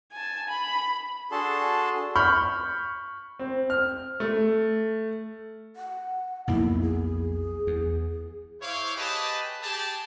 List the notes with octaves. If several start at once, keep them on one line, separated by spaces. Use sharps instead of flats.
G#5 A5
B5
D4 F#4 G#4 A4 A5 C6
B5 C#6 F6 G6
C4
F6
A3
F#5
B1 F2 A#3 E4
G#4
E2
E4 C5 C#5 F5 D6
G4 G#4 B4 D#5 A5
G4 G#4 A5